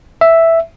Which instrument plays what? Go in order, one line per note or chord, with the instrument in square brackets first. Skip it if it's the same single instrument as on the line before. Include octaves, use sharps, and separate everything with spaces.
[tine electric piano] E5